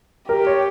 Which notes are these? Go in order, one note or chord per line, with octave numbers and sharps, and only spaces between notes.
G4 A#4
C#5